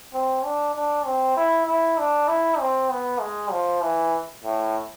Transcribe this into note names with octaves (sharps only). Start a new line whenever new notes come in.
C4
D4
D4
C4
E4
E4
D4
E4
C4
B3
G#3
F3
E3
A2